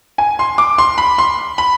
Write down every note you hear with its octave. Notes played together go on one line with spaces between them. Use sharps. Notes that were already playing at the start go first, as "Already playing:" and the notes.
G#5
C6
D6
C6
B5
C6
B5